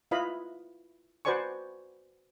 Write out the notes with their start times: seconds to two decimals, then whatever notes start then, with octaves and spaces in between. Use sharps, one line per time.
0.11 E4 F4 B4 D#5 F5 B5
1.25 F#4 B4 C5 D5 G#5 C#6